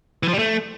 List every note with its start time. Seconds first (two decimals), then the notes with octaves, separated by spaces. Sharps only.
0.23 E3
0.28 F3
0.33 G3
0.39 A3